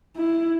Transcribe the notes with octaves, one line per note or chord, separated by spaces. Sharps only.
E4